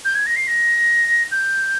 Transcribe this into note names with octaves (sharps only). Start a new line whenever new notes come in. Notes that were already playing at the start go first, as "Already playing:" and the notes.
G6
G#6
A#6
C7
A#6
G6